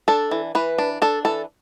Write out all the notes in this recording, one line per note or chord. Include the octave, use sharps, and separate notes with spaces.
D4 A4
E3
E3 B4
D4
D4 A4
E3 A4